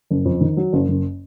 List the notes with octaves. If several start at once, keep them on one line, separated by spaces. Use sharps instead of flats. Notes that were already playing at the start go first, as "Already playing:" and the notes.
F#1
F2
D#3
F#3
F#1
F#1